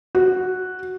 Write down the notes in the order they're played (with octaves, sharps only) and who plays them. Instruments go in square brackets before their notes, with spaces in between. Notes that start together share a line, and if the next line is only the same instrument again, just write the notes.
[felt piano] F#4